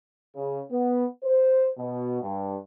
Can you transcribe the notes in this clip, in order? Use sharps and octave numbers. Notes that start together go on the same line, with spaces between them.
C#3
B3
C5
B2
G2